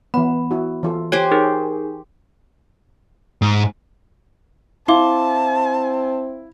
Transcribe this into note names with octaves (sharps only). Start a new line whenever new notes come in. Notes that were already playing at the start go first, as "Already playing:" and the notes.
E3 B3 B5
E4 F#4
E3 F4 A4
G4 C5 C#5 G#5
D#4 G#4 A#4
G#2
C4 E4 F5 A5 C6 D6